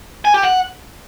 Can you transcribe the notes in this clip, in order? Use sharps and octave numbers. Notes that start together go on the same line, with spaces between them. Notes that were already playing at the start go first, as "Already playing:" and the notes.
G#5
G4
F#5